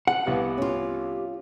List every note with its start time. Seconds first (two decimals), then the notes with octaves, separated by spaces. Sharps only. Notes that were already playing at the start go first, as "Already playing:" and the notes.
0.07 F#5
0.26 C2 B3 G4 F5
0.58 C#4 F4